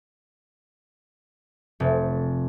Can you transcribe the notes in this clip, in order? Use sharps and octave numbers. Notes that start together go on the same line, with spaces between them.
F1